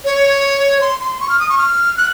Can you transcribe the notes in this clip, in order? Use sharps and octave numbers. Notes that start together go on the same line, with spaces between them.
C#5
C6
C6
C#6
F6
D#6
C#6
F6
F#6